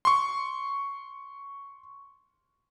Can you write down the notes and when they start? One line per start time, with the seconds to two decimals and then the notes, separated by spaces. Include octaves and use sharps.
0.05 C6 C#6